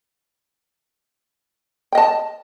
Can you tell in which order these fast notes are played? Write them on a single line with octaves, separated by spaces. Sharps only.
G5 D#5 A5